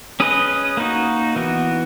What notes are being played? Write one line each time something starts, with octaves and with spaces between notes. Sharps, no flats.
C#4 G#4 B4 D#5
A#3 D#4 F#4
E3 B3 F#4